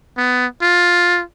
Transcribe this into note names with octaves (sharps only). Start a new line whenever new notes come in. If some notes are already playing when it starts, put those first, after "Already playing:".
B3
F4